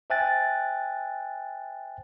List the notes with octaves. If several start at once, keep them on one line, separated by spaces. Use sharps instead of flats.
C5 E5 G5 G#5 F#6 A6